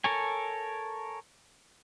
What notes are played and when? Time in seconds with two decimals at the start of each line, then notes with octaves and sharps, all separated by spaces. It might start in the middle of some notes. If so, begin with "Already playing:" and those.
0.04 A4 A#4 C#5 G#5